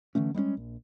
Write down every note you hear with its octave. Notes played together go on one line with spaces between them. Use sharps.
D3 E3 A3 C#4
G3 G#3 A#3 C#4
A#1